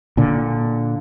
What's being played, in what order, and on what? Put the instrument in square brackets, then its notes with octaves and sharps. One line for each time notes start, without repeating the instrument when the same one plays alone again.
[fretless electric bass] A#2 D3